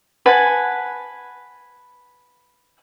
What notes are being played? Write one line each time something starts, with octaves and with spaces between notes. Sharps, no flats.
B4 F#5 G#5 A5